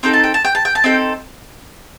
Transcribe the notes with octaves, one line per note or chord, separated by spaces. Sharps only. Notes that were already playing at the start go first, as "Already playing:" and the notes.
C4 D#4 A4 G5
A5
G5
A5
G5
A5
G5
A5
C4 D#4 A4 G5